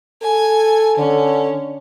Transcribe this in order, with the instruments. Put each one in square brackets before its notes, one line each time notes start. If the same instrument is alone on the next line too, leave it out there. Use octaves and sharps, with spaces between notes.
[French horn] A4 [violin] G#5
[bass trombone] D3 [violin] C#4